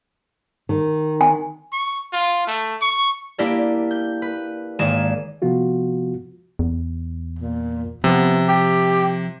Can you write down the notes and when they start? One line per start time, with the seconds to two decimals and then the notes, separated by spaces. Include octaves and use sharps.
0.69 D#3
1.21 G#5
1.73 C#6
2.13 F4
2.47 A3
2.82 C#6
3.38 A#3 D4 E4 G4 A#4 D5
3.91 G6
4.22 B4
4.79 G#1 A#3 G#4 D5 E7
5.42 C3 F3 B3 F4 F#4
6.59 E2
7.39 A#2
8.04 C3 F3 B3
8.48 G4